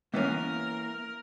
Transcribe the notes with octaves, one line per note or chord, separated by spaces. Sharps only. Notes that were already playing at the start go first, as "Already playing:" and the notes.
E3 A#3 B3 C#4 A#4 E5 F5